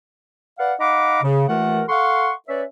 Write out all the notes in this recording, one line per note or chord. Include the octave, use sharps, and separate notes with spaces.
B4 D5 F5 F#5
D#4 F5 F#5 A#5 B5 D6
C#3
D#2 E3 A3 F4 A#4 F#5
A4 F5 F#5 C6 C#6
C#4 B4 C#5 D5 E5